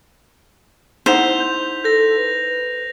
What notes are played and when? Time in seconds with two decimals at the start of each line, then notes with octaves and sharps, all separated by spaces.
1.06 D#4 E4 C5 F#5 B6 F7
1.40 G6
1.84 A4 G6 A#6
2.18 B4